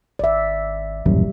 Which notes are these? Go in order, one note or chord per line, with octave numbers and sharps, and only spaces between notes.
G#1 D5 E5
D#1 A1 F#2 B2 G3